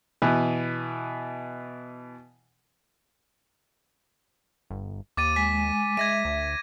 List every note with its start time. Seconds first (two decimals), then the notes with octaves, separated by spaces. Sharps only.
0.22 B2 E3
4.70 G1
5.17 D#2 D6 A6 D#7
5.36 G#3 G#5 B6
5.97 G#3 E5 G#6 A#6 D#7
6.25 D2